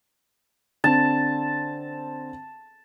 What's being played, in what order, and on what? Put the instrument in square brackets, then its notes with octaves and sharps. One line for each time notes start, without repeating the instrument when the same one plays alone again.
[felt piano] D3 C4 [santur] A5